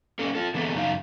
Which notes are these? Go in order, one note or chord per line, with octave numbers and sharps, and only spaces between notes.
A#3 C#4 A4
F4 A4
D3 E3 A#3 B3 G#4 A4
F#2 C#3 D#4 F5